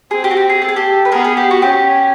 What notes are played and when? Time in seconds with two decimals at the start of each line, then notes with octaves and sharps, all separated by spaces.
0.11 C4 G#4
0.24 G4
0.31 F#4
0.37 G4
0.50 G#4
0.62 A4
0.69 G#4
0.76 G4 A4
1.05 B4
1.12 B3 G#4 A#4
1.24 G#4
1.37 G4
1.51 F#4
1.62 C#4 G4